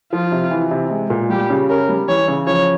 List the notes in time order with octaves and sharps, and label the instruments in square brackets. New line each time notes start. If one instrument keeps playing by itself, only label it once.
[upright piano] F3 [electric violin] F4
[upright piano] C3
E3
C3
G#3
A#2
[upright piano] G3 [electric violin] G4
[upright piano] C#3
[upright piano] C#4 [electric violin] A#4
[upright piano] G3
[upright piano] E3 [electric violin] C#5
[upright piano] C#3
[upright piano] F3 [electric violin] C#5